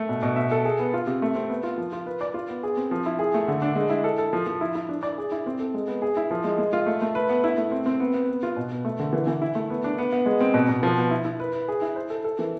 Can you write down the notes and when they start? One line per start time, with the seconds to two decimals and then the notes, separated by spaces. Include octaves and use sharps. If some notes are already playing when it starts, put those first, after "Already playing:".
Already playing: A3
0.09 B2
0.23 B2
0.36 E5
0.51 A4
0.65 G#4
0.79 B3
0.94 F4
1.07 C3
1.22 A3
1.35 C4
1.49 B3
1.63 F4
1.78 F3
1.93 F4
2.06 B4
2.21 D5
2.34 F4
2.49 B3
2.63 G#4
2.77 C4
2.91 F3
3.06 E4
3.19 G#4
3.34 A3
3.48 D3
3.62 D4
3.75 G#3
3.90 E4
4.04 A4
4.18 A4
4.33 F3
4.47 F3
4.61 E4
4.75 E4
4.89 D4
5.03 D5
5.18 G#4
5.32 E4
5.46 C4
5.60 A4
5.74 G#3
5.88 B3
6.02 G#4
6.17 E4
6.31 F3
6.44 G#3
6.58 G#3
6.73 F4
6.86 A3
7.02 A3
7.15 B4
7.29 B3
7.44 E4
7.58 A3
7.71 C4
7.86 C4
8.00 B3
8.14 B3
8.28 B3
8.43 F4
8.57 B2
8.71 B3
8.85 A3
8.99 D3
9.13 E3
9.27 E3
9.42 E4
9.55 A3
9.70 B3
9.84 D4
9.98 B3
10.12 B3
10.26 G#3
10.40 C4
10.54 B2
10.69 B2
10.83 F3
10.98 B3
11.11 E4
11.25 E4
11.40 B4
11.53 B4
11.68 G#4
11.82 E4
11.96 C5
12.10 A4
12.24 A4
12.39 E3